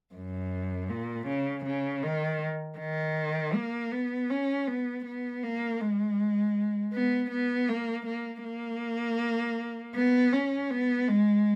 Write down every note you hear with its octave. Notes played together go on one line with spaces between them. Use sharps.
F#2
A#2
C#3
C#3
D#3
D#3
A#3
B3
C#4
B3
B3
A#3
G#3
B3
B3
A#3
A#3
A#3
B3
C#4
B3
G#3